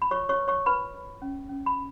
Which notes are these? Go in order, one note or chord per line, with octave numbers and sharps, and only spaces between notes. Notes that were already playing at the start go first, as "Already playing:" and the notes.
B5
F4 C#5 C#6
C#5 C#6
B4
C#5 C#6
F4 B4 B5
B4
C#4
C#4
B5